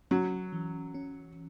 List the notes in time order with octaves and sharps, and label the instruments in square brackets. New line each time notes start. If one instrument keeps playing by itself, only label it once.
[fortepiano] F#3 [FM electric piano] C#4
[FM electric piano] E3
C#4